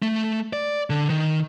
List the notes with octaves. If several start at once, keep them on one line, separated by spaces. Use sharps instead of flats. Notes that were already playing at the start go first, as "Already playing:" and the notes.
A3
D5
D3
D#3